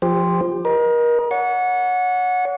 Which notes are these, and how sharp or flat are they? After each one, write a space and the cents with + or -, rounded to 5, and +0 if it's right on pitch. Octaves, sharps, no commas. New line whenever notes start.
F3 +0 G4 +25 C5 -5
A#4 +35 D#5 +0
C#5 +40 F#5 -20